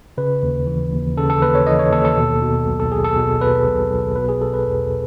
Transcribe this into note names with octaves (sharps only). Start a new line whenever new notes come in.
C#3 B4
D#2
E3
D#2
C#3 A4
A4
D#2 B4
C#5
E3 D#5
C#5
D#2 A4
A4
B2
B2
B1
A4
B1 G#4
A4
B2
B2 B4
B1
B1
B2 B4
G#4
B2 A4
B4
E2